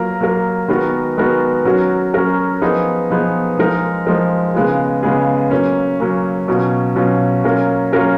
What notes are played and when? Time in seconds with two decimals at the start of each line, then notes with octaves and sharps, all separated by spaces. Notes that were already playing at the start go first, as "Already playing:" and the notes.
Already playing: F#3 A#3 F4 A#4
0.21 F#3 A#3 F4 A#4
0.68 D#3 G#3 B3 F#4 A#4
1.17 D#3 G#3 B3 F#4 A#4
1.65 F#3 C#4 F#4 A#4
2.14 F#3 C#4 F#4 A#4
2.61 F3 B3 D#4 G#4
3.10 F3 B3 D#4 G#4
3.58 F3 G#3 D#4 A#4
4.06 F3 G#3 D#4 A#4
4.54 C#3 G#3 B3 F4 G#4
5.03 C#3 G#3 B3 F4 G#4
5.51 F#3 A#3 C#4
6.00 F#3 A#3 C#4
6.48 B2 F#3 C#4 F4
6.96 B2 F#3 C#4 F4
7.44 F#3 A#3 C#4 F4 A#4
7.92 F#3 A#3 C#4 F4 A#4